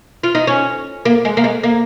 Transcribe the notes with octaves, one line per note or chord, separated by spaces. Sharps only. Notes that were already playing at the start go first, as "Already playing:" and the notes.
F4
D#4
C#4
A#3
G#3
A#3
G#3
A#3